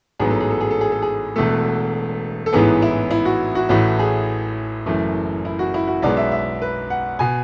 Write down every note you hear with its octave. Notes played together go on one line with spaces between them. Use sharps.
A1 G#2 F#3 B3 G#4
A4
G#4
A4
G#4
A4
G#4
A4
G#4
E1 E2 B2 A3 A4
A4
A1 G#2 E3 B3 G#4
E4
E4
F#4
F#4
A1 A2 E3 A3 F#4
G#4
F#1 F#2 E3 A3
E4
F#4
E4
F#4
B1 B2 G#3 B3 D5
E5
E5
B4
F#5
B2 G#5